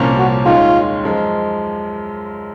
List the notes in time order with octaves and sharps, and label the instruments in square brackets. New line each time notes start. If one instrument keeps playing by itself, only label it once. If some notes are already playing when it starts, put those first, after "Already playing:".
Already playing: [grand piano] C2 A#2 F3 A#3 C#4
[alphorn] F#4
[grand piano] D#2 D#3 G#3 C#4 [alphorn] F4
[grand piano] F#2 F3 G#3